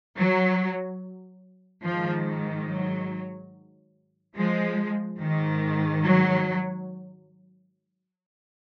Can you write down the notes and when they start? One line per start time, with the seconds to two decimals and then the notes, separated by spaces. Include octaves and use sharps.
0.17 F#3
1.84 G#2 D#3 F3
2.68 F#3
4.36 F3 G#3
5.19 G#2 D#3
6.03 F#3